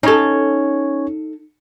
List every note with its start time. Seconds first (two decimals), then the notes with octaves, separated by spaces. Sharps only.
0.03 C#4 D#4 A4 C#5